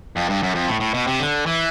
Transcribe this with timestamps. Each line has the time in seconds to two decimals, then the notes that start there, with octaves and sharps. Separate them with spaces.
0.16 F2
0.29 G2
0.43 F#2
0.55 F2
0.68 A2
0.80 A2
0.94 B2
1.07 C3
1.20 D3
1.46 E3